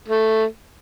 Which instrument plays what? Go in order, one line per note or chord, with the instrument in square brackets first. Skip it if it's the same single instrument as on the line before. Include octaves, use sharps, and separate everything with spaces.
[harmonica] A3